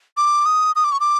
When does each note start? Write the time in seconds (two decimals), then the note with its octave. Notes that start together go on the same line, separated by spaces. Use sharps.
0.17 D6
0.46 D#6
0.76 D#6
0.84 D6
0.92 C#6
1.00 D6